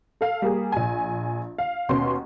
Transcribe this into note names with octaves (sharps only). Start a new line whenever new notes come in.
A4 F5
G3 A#3 G#4
A#1 G#5
F5
D#2 B2 C#4 C6